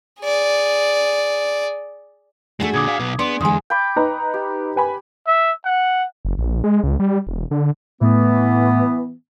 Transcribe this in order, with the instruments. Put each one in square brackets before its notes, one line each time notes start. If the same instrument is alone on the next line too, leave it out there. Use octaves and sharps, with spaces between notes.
[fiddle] G#4 D5
[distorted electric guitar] G#3 A3 [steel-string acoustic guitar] D4 F#4 G#4
[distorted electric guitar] A#2 D3 [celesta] D6 D#6 G#6
[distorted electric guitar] D5 F5
B1 B3
[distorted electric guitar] B3 [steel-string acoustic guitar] D4 G#4 [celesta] C6 D7
[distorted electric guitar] E2 [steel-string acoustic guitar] D3 G#3 [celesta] G#5 C6 D#6
[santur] G5 B5 D6
[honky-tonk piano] D#4 B4 A#5
[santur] G4
[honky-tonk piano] B4 G#5 B5
[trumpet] E5
F#5
[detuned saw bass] F#1
A#1
G#3
C#2
G3
E1
D3
[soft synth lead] A2 [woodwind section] E3 B3